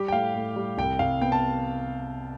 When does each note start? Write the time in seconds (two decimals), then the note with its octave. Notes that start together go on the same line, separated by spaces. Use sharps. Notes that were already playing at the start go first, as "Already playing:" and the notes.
Already playing: G3 G4
0.08 G5
0.12 A2 F5
0.35 A2
0.56 G3
0.78 C2 G5
0.99 C2 F5
1.21 B3 G5
1.32 A5